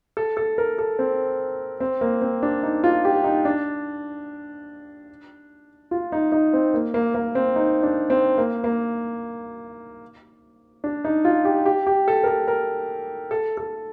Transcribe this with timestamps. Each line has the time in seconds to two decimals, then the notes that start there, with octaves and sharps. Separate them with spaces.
0.17 A4
0.37 A4
0.58 A#4
0.78 A4
0.99 C4
1.80 C4
2.01 A#3
2.22 C4
2.43 D4
2.63 D#4
2.84 F4
3.05 G4
3.24 D#4
3.45 D4
5.91 F4
6.12 D#4
6.32 D#4
6.53 C4
6.74 A#3
6.94 A#3
7.15 A#3
7.35 C4
7.56 D#4
7.83 D4
8.10 C4
8.38 A#3
8.64 A#3
10.84 D4
11.05 D#4
11.25 F4
11.45 G4
11.66 G4
11.87 G4
12.08 A4
12.24 A#4
12.28 A4
12.48 A#4
13.31 A4
13.57 A4